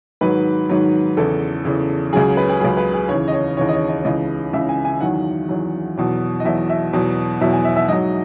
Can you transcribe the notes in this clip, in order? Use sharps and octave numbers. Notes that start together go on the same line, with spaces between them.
G#2 D#3 F#3 B4
G#2 D#3 F#3
E2 C#3 E3 A4
E2 C#3 E3
C#2 C#3 F#3 G#4
B4
G#4
C#2 C#3 F#3 G#4
B4
G#4
D#2 C#3 E3 C#5
D#5
C#5
D#2 C#3 E3 C#5
D#5
C#5
D#5
C#2 C#3 E3 D#5
C#2 C#3 E3 E5
G#5
G#5
E2 D#3 F#3 F#5
E2 D#3 F#3
E2 B2 F#3
D#5
E2 B2 F#3 E5
E5
E2 B2 F#3
E2 B2 F#3 E5
G#5
E5
E5
G#2 F#3 D#5